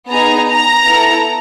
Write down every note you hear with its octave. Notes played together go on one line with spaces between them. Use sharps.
B3 D#4 G#4 A#5
A#5
B3 E4 A4